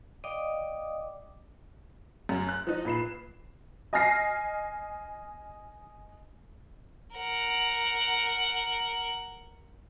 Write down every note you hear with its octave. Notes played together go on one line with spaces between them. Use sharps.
D5 D#5 F5 G5 D6 D#6
F#2
F#6
F3 D#4
A#2 B4 C7 E7
D#5 G#5 F6 A#6 C7
A#4 F#5